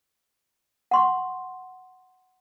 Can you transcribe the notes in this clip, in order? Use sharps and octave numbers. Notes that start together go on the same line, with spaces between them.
F#5 C6 C#6